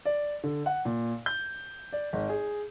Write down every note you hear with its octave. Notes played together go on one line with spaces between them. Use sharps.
D5
D3
F#5
A#2
G6
D5
G#1
G#4